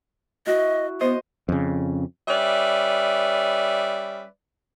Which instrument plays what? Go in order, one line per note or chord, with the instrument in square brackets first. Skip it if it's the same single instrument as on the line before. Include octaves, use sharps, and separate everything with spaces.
[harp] E4 F#4 [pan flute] D#5
[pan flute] B3 [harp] C5 D#5
[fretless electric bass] F2 C#3
[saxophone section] G3 C#4 B4 D5 E5